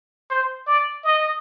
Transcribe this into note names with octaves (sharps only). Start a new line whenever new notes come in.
C5
D5
D#5